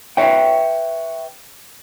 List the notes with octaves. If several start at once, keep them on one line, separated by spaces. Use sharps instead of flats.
B4 C#5 E5 G5